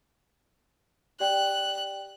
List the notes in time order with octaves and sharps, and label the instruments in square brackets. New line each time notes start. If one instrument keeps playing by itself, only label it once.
[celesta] G4 D5 G5 [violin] F#6